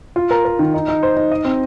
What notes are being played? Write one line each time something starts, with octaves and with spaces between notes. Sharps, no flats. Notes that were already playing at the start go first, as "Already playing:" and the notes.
F4
A#4
A#4
D#3
D#4
D#4
C5
D#4
D#5
C4